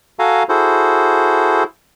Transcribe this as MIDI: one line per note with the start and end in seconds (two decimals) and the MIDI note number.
0.19 0.43 66
0.19 0.43 69
0.19 0.43 77
0.19 0.43 80
0.19 0.43 82
0.49 1.63 64
0.49 1.63 66
0.49 1.63 68
0.49 1.63 69
0.49 1.63 72